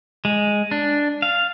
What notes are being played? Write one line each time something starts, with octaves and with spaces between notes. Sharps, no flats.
G#3
D4
F5